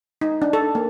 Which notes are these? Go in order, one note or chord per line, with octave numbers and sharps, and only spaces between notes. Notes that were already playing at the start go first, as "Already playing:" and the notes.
D#4
D4
A4
A#3